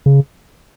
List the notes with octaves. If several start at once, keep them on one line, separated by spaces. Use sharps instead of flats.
C#3